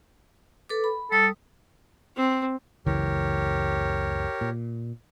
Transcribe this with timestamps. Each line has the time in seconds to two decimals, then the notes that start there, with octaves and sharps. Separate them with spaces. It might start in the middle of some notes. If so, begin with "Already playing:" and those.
0.69 A4 B4 D6
0.84 B5
1.12 G3 A4 D#6
2.16 C4
2.86 F#1 C#2 E3 G4 A#4 C#5
4.41 A#2